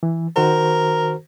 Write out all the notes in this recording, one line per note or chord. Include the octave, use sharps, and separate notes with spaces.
E3
D#3 F#4 A#4 C5